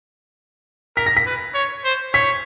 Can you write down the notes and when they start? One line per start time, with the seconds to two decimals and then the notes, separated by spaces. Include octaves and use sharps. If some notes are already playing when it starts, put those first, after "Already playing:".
0.96 A#4 B6
1.06 A#6
1.17 B6
1.26 B4
1.54 C#5
1.84 C5
2.13 C#5 B6